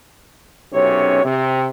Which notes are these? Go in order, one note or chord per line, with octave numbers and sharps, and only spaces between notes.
B1 F#2 C3 C#4 C#5
C3